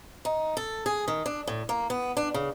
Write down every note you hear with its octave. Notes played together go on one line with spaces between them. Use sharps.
D#4
A4
G#4
D#3
D4
A2
A#3
B3
D4
C#3